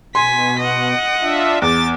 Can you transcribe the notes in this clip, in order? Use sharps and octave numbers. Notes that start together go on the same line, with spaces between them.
B2 G#5 C6 B6
D#5 F#5
D4 F4 E5
E2 D6 A6